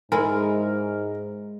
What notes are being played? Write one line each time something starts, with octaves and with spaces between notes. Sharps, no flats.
G#2 G#3 E4 A#4